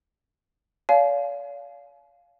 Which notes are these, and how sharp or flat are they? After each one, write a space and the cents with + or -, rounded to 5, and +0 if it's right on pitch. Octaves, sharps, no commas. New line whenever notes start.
D5 -45 F5 +0 G#5 +45